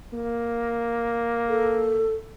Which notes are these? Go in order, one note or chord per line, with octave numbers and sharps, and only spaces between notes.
A#3
A4